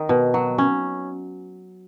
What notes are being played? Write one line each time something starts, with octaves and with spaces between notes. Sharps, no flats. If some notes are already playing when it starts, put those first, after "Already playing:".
Already playing: D#3 D#4
B2
F#3
C#4